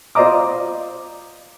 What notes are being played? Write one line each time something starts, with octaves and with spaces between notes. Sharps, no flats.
F4 C5 D5 D#5 A#5 D6